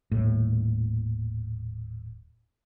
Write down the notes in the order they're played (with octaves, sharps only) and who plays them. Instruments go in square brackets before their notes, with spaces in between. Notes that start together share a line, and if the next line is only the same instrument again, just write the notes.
[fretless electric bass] D#1 A2